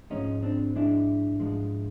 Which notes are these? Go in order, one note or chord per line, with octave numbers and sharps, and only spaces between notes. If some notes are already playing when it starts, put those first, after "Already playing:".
G#2 F3 G#3 C#4 D#4
C4 D4
G#2 F3 G#3 D4 E4
G#2 F3 G#3